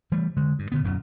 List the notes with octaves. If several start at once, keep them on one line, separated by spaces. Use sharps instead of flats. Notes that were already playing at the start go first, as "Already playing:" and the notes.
E3 G3 A3
D3 G#3
G2
A#2 D3 B3
D1 F#2 A#2